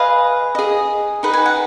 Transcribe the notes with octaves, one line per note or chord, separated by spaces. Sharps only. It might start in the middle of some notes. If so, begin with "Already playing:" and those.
Already playing: G#4 B4 D#5 F5
G#4 D#5
D#4 G#4 B4 D#5 F#5
G#5
F#5